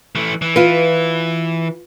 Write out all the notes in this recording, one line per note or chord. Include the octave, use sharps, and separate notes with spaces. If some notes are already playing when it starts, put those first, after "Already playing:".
E3 A3
E3
F4 B4